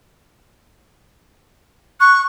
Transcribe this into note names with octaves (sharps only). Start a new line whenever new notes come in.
C#6 F#6